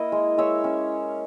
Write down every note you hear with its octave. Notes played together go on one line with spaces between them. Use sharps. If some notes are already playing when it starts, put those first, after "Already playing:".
Already playing: A#3 E4 D#5
G#3
G#3 C#5 E5
C#4